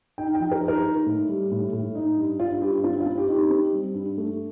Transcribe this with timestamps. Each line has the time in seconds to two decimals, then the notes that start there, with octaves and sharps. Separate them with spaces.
0.18 D#4 G5
0.35 G5
0.40 F3
0.51 A#4
0.62 D#4
0.68 A#4
0.85 D#4
1.06 A2
1.29 G3
1.51 A2
1.73 A2
1.95 D#4
2.17 G2
2.40 G2 F4
2.61 G2 G4
2.84 C4 F4
3.00 F4
3.06 C4
3.18 G4
3.28 D#4
3.34 G4
3.50 C4
3.73 G3
3.94 G2
4.17 A3